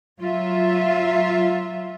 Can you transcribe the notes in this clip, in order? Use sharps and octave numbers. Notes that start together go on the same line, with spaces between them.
F#3 F4 E5